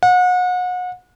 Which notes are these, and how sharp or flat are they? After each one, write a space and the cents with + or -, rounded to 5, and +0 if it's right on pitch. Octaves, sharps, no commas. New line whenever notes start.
F#5 -35